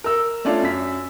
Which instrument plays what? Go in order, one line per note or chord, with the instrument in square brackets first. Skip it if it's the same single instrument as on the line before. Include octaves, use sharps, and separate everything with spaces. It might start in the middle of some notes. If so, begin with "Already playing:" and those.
[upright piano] A#4 E6
A3 C#4 D4 F4
F#2 B6